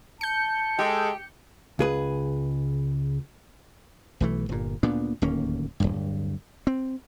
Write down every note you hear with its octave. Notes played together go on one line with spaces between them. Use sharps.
A5 G6 C#7
G#3 G4 A4
C#2 G#4 B4
B1 E3 A3
G1 A#2
D2 A#2 B3 D4
D1 D#2 A#3 C#4
D1 B1 G2
C4